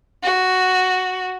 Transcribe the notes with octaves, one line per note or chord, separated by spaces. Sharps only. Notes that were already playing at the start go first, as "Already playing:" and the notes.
F#4